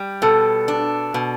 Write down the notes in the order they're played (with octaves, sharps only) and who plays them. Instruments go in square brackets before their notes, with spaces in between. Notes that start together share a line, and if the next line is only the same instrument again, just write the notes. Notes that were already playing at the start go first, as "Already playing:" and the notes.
Already playing: [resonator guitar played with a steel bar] G3
[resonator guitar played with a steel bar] B2 [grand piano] A4
[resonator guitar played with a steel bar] D4
B2